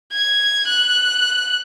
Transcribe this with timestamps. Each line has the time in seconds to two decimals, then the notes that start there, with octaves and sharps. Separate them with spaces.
0.13 G#6
0.68 F#6